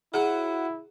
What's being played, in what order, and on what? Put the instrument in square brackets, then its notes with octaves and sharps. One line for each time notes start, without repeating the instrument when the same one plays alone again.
[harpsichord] F#3 [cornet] E4 [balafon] G#4